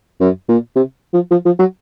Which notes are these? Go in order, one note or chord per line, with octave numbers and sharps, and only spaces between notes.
F#2
A#2
C3
F3
F3
F3
F#3